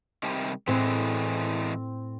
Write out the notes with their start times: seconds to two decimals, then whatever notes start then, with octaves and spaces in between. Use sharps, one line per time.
0.23 C3 D#3 G3
0.67 A2 E3 G#3 C4